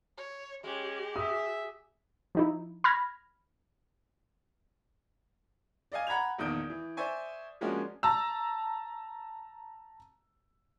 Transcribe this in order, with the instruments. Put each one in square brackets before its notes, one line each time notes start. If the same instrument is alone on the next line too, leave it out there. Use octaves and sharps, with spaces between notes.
[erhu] C#5
[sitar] G#3 [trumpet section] C#4 [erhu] G4
[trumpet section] E5 [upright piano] D#6
[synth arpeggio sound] F3 D#4 E4
B5 F6 G#6 A#6
[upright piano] D5 D#5 F5 G#5
F#5 A#5 B5 G#6 F7
A#1 E2 D#3 D#6 G6 D7
E3
C5 D5 E5 G#5 C#6
F3 G#3 A#3 C#4 D4 F#4
A5 A#5 E6